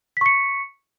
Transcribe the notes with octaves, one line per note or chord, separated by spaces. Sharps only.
C#6 B6 C#7